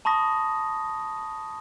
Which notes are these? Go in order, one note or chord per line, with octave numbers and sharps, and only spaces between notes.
A5 B5 C#6 D#6 A#6